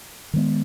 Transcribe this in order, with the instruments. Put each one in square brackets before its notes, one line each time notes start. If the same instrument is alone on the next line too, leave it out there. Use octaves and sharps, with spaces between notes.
[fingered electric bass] D#3 G#3 B3